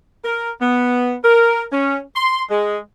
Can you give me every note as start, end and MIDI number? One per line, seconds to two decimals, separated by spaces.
0.25 0.51 70
0.62 1.16 59
1.25 1.64 70
1.72 1.99 61
2.15 2.43 84
2.50 2.79 56